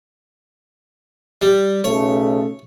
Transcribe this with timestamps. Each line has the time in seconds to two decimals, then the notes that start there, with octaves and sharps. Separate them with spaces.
1.42 G3
1.84 B1 C#3 A3 C#5